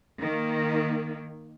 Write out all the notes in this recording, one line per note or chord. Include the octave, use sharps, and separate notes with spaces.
D#3 A#3